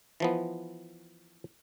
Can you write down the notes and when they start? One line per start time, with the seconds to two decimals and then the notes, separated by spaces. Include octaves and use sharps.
0.20 E3 F3 B3